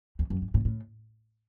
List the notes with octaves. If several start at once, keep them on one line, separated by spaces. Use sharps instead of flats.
E2
F#2
G#2
A2
A2